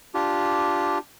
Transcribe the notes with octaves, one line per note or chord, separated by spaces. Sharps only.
D4 F4 G4